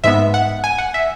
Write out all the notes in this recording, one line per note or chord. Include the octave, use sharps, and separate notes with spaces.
G#2 G#3 B3 E5
F#5
G#5
F#5
E5